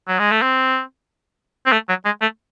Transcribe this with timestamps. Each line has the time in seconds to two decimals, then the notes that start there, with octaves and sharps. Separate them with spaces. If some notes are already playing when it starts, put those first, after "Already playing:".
0.08 F#3
0.19 G#3
0.31 A3
0.42 C4
1.66 C4
1.72 A3
1.89 F#3
2.05 G#3
2.21 A3